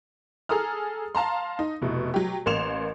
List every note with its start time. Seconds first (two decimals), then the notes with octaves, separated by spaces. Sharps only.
0.49 G#4 A4 A#5 D#6 F6
1.15 F5 A5 A#5 C6
1.59 D#4
1.82 F1 B2 E4
2.14 F#3 G4
2.46 A1 A#3 C6 E7 F7